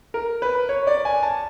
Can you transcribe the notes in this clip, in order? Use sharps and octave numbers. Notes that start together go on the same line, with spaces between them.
A#4
B4
C#5
D5
G#5
A5